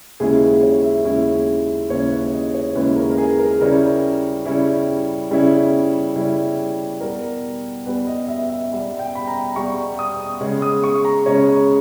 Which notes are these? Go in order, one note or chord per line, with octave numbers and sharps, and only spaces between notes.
D#2 C#3 G#3 C#4 E4 G#4
B4
C#5
E5
D#2 C#3 G#3 C#4 E4
D#2 C#3 G#3 C#4 E4 C#5
B4
D#5
C#5
D#2 C#3 G#3 C#4 E4 B4
A#4
A#4
G#4
A#4
C#3 G3 C#4 E4 A#4
C#3 G3 C#4 E4
C#3 G3 C#4 E4
C#3 G3 C#4 E4
E2 B2 G3 A#4
E2 B2 G3 B4
D#5
E5
E5
E2 B2 G3
G5
B5
A#5
E2 B2 G3 C#6
D#6
C#3 G#3 C#4
D#6
C#6
A#5
C#3 G#3 C#4 C#5